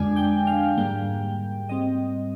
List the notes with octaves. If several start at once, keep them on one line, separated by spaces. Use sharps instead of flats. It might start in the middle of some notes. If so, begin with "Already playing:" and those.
Already playing: F2 D3 G#3 D4 G#5
G5
F5
G#2 G3 A#3 G5
G#2 G3 C4 D#5